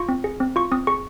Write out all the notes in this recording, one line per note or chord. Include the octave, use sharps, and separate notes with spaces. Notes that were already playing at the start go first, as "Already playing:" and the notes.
Already playing: F4 C#6
C4
G#4
C4
F4 C#6
C4 D#6
G#4 C#6